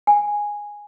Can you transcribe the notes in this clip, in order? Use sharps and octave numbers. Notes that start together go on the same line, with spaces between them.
G#5